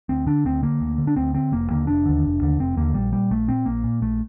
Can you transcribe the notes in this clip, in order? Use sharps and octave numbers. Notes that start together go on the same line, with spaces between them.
D2 C4
D3 D4
D2 C4
D3 A#3
D2
D3
D4
D2 C4
D3 C4
F1 A#3
D#2 D3 A#3
F1 D4
D#2 D3
F1
D#2 D3
F1 C4
D#2 D3 A#3
A#1 G3
A#2 G3
A#1 A3
A#2 C4
A#1 A#3
A#2
A#1 A3